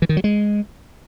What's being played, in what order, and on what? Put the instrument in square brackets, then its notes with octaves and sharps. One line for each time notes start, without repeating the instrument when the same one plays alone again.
[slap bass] E3
D#3
F#3
G#3